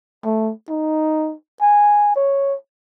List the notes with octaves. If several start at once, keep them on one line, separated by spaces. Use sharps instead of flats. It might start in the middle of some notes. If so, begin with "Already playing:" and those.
A3
D#4
G#5
C#5